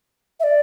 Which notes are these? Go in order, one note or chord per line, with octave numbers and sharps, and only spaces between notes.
E5
D5